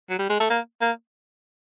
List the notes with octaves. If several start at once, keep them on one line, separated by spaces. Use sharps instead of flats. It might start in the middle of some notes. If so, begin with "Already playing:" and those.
F#3
G3
G#3
A3
A#3
A#3